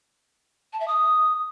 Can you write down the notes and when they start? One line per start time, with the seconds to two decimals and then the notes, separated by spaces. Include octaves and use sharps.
0.72 A5
0.80 E5
0.87 D#6